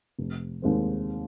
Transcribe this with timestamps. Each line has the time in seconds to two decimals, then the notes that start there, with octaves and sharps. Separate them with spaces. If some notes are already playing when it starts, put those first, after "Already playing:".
0.18 F1
0.62 D#2 D#3 G#3 C4